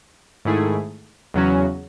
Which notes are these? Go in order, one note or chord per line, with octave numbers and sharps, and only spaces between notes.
G#2 D#3 A3 E4 G#4
E2 C#3 F#3 C#4 F#4